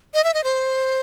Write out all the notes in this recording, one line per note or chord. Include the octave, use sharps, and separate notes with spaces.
D#5
E5
D#5
C5